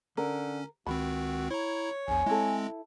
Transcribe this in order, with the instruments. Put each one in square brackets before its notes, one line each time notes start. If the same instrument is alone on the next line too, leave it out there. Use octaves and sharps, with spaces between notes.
[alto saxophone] D3 [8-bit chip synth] C#4 [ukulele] A#4
[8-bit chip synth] C#2 D#3 C4 [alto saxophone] F#4 [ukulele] B5
[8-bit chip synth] E4 A#5 [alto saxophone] C#5
[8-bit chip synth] A#1 E2 [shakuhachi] G#5
[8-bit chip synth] G#3 C4 [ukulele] E4 A4